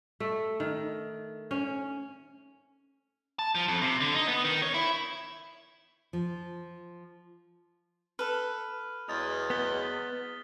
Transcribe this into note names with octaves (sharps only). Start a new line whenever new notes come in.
A3
D#3
C#4
A5
F3
F2
C3
D3
D#4
B3
D#3
C#5
E4
F3
A4 B4 F6
E2 F#3 G#3 D#6 A6
B3 B6 G7